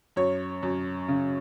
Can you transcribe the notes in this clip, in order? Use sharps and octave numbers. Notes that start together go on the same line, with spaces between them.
F#2 C#5
F#2
C#3